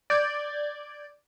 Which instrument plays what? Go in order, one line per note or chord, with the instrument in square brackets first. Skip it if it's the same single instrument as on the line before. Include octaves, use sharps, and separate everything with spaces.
[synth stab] D5 G6 G#6